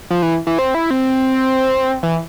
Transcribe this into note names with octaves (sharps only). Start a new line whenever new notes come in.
F3
E3
E3
C4
E4
C4
E3